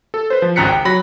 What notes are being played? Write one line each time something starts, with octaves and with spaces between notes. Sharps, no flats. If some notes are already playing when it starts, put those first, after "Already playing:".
A4
B4 C5
F3
G#1 C#2 A#5 F#6 B6 C#7
G5
F#3 B5 A#6